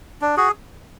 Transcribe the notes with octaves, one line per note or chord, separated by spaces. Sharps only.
D4
F#4 G#4